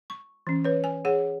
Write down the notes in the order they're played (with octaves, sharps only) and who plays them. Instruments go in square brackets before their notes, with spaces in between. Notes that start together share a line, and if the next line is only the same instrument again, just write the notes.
[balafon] C#6
E3 C#4
B4 C#5
G#5
G#4 C#5 F#5